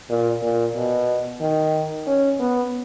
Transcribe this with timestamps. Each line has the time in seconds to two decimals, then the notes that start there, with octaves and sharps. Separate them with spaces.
0.10 A#2
0.42 A#2
0.75 B2
1.41 D#3
2.07 C#4
2.39 B3